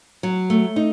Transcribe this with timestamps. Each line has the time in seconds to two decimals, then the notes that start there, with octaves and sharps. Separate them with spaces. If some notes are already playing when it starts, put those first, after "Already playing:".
0.23 F#3
0.50 A3
0.76 D#4